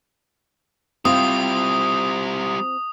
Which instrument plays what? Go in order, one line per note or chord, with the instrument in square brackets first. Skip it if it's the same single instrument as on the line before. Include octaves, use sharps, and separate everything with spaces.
[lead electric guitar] G3 E4 [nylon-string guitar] C4 F4 [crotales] D#6